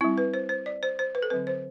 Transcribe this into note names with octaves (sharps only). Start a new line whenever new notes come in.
G3 C4 E4
B4
C5
C5
D5
C5
C5
B4
A4
D3 F#3 C4 B4
C5